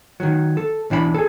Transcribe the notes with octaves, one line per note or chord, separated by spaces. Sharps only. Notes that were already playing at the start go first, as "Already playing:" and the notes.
D#3 F#3
A4
B1 E3 D4 E5 B5
G#4 A4